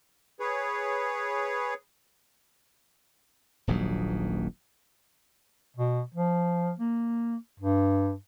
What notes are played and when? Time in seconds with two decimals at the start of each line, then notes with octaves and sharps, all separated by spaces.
0.40 G#4 B4 C#5
3.67 D#1 A#1 G#2 F#3
5.76 B2
6.14 F3
6.79 A#3
7.60 G2